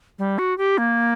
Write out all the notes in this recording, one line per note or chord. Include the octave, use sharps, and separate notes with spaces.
G3
F#4
G4
A#3